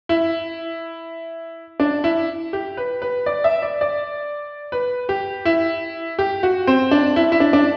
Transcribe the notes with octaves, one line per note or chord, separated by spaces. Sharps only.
E4
D4
E4
G4
B4
B4
D5
E5
D5
D5
B4
G4
E4
G4
F#4
C4
D4
E4
E4
D4
D4